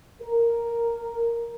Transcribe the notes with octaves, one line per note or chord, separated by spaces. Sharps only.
A#4